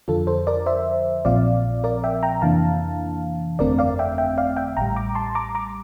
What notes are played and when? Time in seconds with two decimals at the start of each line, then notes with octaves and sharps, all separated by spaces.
0.08 F2 D3 F3 F4 A4
0.27 A4 C5
0.47 A#4 D5
0.66 C5 E5
1.25 A#1 A#2 F3 C4 D5 F5
1.84 A#4 D5
2.04 E5 G5
2.23 G5 A#5
2.42 F2 C3 E3 A#3 D4 F5 A5
3.59 G1 F2 D3 A3 C4 A#4 D5
3.79 D5 F5
3.99 E5 G5
4.18 E5 G5
4.38 D5 F5
4.57 E5 G5
4.77 A1 A2 G3 G5 A#5
4.96 A#5 D6
5.15 A5 C6
5.35 A#5 D6
5.55 A#5 D6